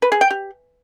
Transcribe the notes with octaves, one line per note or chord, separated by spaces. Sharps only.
B4
G#4
G5
G4